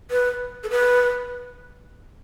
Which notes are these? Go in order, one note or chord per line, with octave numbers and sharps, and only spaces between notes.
B4
A4
B4